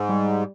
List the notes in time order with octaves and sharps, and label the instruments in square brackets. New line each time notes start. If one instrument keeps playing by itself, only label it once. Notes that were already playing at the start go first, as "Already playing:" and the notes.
Already playing: [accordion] G#2
[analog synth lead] G3